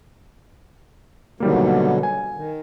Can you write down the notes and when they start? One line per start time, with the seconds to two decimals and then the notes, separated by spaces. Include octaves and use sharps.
1.40 B2 D3 D#3 F#3 G3 A#3
2.03 G#5
2.35 D#3